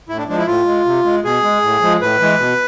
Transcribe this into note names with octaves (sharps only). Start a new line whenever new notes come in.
A2 E4
D4
F3 G#3 D4
E4
A2 F4
G#3
C3
G#3
B2 G#4
G#3
A2
F3 G#3
A2 B4
E3 G#3
B2